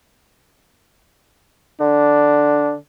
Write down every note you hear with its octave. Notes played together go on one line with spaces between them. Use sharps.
D3 D4